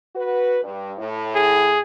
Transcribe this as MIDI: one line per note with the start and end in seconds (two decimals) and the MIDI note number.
0.16 0.59 66
0.16 0.59 71
0.63 0.93 43
0.99 1.79 45
1.36 1.81 68